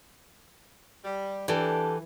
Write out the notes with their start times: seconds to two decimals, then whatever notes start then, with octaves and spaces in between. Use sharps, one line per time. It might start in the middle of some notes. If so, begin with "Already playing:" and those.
1.04 G3
1.48 E3 D4 G4 A4